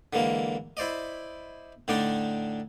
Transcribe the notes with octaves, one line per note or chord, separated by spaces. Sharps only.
D3 E3 G#3 A#3
E4 C5 D5 D#5
A2 D3 D4 D#4 D5 C6